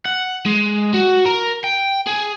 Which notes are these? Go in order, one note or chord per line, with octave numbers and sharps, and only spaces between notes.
F#5
G#3
F#4
A#4
G5
G#4